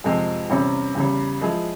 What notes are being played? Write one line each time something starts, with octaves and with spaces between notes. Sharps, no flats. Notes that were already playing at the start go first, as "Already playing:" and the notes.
F2 C3 F3 G#3 C4
E2 C3 G3 C#4
E2 C#3 G3
F3 G#3 E4 G#4